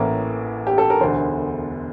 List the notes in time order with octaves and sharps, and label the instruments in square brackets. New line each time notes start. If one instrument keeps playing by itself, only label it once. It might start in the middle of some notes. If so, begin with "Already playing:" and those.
Already playing: [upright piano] A1 A2 E3 A#3
G4
A4
A#4
E1 D2 D3 C5